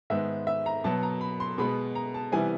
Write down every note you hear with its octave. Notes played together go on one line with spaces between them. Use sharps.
G#2 D#3 G#3 B3 E5
E5
A#5
B2 F#3 B3 A5
A#5
B5
C6
B2 G#3 B3 B5
A#5
A5
C3 E3 G3 B3 G#5